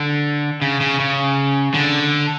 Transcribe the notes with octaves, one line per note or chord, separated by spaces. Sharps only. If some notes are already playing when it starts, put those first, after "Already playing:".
Already playing: D3
C#3
C#3
C#3
D3